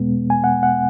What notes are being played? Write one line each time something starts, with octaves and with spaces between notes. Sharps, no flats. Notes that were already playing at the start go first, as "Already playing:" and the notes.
Already playing: E2 B2 G#3 B3
G#5
F#5
F#5